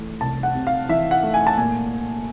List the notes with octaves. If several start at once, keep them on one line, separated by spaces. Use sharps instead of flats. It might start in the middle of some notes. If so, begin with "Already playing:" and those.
Already playing: E3 A3
C2 A5
F#5
C3
F5
E3 E5
F#5
A3
G#5
A5
A#2 G#5